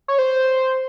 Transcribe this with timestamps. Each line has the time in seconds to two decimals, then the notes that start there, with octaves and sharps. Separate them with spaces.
0.08 C#5
0.19 C5